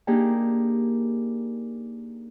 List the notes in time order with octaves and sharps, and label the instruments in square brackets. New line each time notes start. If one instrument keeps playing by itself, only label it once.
[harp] A#3 D4 D#4 G4 G#4